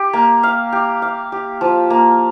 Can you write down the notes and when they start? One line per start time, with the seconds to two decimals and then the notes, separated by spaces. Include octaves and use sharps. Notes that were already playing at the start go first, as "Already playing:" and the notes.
Already playing: G4
0.13 A#3
0.43 F5
0.72 G4
1.02 F5
1.32 G4
1.61 F3
1.90 A#3